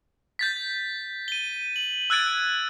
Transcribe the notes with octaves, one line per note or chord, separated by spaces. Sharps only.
G6 A6 B6
D#7 G7
F#7
E6 F#6 G#6 A6 D7